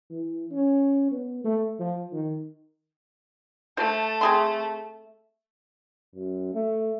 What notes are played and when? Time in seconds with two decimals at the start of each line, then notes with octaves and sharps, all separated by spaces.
0.10 E3
0.51 C#4
1.11 B3
1.44 A3
1.80 F3
2.12 D#3
3.77 A3 C5 A5
4.21 C4 G#4 C6
6.15 F#2
6.54 A3